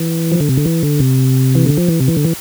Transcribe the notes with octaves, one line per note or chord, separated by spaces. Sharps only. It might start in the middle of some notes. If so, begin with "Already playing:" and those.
Already playing: E3
F3
D3
C3
D3
E3
D3
C3
E3
D3
F3
E3
C3
E3
D3
E3